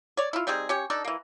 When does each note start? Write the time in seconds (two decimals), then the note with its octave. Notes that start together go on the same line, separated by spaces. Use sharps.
0.17 C#5 D5
0.33 E4 F4
0.47 G3 C4 D#4 G#4
0.69 C#4 G4 C#5
0.90 D4 D#4 A4
1.04 E3 A#3